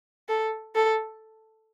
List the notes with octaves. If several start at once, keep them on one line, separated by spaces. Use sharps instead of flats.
A4
A4